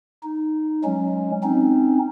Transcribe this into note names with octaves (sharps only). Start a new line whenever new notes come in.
D#4
F#3 G#3 C#4
C4 C#4 D#4